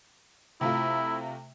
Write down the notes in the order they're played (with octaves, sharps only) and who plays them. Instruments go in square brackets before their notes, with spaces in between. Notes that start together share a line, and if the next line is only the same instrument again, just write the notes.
[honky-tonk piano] C3 A3 F4 [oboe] E4